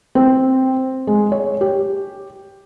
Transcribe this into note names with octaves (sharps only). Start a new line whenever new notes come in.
C4
G#3
C#5
G4